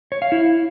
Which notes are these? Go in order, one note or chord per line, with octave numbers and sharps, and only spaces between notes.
C#5
F5
E4